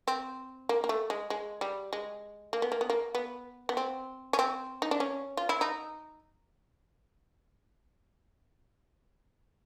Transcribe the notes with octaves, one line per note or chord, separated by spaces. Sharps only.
C4
A#3
A#3
A3
G#3
G#3
G3
G#3
A#3
B3
A#3
B3
A#3
B3
B3
C4
C#4
C4
D#4
D4
C#4
F4
E4
D#4